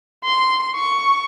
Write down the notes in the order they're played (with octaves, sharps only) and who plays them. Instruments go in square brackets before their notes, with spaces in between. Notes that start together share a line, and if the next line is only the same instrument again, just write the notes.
[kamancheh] C6
C#6